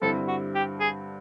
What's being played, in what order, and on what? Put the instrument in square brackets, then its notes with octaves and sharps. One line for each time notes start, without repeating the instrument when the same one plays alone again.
[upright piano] G2 D3 G3 C4 E4 [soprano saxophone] A4
[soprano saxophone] F#4
G4
G#4